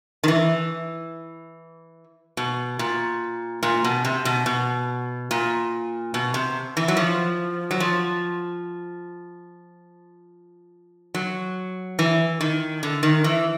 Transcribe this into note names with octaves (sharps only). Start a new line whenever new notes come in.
D#3
E3
B2
A#2
A#2
B2
C3
B2
B2
A#2
B2
C3
E3
F#3
F3
F#3
F3
F#3
E3
D#3
D3
D#3
E3